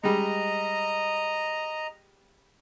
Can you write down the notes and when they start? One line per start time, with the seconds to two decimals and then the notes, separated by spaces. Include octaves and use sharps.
0.03 G3 G#3 D#5 A#5